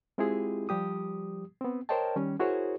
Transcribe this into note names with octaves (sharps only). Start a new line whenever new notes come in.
G#3 C4 E4 F4 G4 G#4
F3 G3 G4 D#6
B3 C4
A#4 C5 C#5 D#5 G5 A5
D#3 G3 C#4
E4 F#4 G#4 A#4 C5 C#5